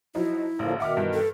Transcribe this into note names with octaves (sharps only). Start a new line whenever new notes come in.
F3 F#3 D#4 E4
A1 D3 F3 A#3
B2 D#3 E5 F#5 D6 F6
G2 E3
A4